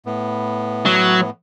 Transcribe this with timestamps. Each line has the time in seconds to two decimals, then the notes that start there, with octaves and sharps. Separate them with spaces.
0.06 A2 B3
0.86 F#3